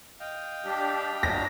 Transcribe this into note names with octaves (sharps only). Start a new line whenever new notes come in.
D#5 F5 G5
G3 D4 G4
F#3 D4 A#6